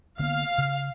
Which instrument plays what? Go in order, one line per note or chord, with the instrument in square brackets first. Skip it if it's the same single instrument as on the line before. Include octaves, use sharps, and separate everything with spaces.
[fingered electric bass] D3 A#3 B3 [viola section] F5
[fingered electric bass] C#3